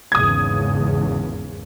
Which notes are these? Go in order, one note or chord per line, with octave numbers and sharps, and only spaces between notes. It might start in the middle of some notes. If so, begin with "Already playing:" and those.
G#1 E2 C#3 D#6 G#6